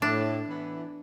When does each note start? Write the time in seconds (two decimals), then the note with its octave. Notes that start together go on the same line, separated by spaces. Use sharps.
0.02 A2 D4
0.47 E3 B3 E4